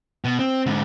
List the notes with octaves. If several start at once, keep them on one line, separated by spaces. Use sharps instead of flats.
B2
C4
G#2 D3